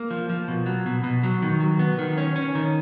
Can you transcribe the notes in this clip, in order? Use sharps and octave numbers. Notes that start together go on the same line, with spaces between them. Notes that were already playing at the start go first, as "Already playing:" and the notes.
Already playing: A#3
F3
F3
B2
F#3
B2
B2
F#3
D#3
F#3
B3
D#3
C#4
C#4
D#3